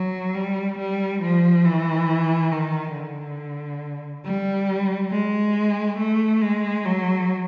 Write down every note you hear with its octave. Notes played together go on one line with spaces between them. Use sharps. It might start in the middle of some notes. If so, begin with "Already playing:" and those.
Already playing: F#3
G3
G3
F3
E3
D#3
D3
G3
G#3
A3
G#3
F#3